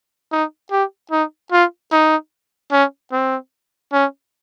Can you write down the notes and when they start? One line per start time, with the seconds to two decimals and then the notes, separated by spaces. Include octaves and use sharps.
0.32 D#4
0.72 G4
1.12 D#4
1.52 F4
1.92 D#4
2.72 C#4
3.12 C4
3.93 C#4